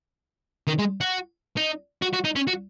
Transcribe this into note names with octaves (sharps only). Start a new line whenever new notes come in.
D#3
G#3
F#4
D#4
F#4
F#4
D#4
C#4
F#4